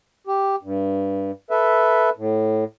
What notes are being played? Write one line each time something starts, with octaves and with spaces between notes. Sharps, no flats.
G4
G2
A4 B4 E5
A2